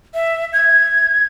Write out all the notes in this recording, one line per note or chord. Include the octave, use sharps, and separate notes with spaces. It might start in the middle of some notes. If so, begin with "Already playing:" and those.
E5
G#6